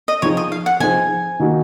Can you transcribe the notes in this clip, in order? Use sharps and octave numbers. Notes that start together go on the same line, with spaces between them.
D#5
F3 C4 D#4 G#4 C5 C#5
D#5
F5
F#5
F3 C4 D#4 G#4 C5 G#5
D#3 A#3 D#4 F#4